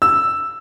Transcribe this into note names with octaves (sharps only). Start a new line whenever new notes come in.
E6